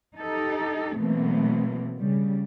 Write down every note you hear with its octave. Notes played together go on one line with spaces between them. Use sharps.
D#4 G4 A4
B2 E3 F#3 A3 A#3 C4
C#3 G3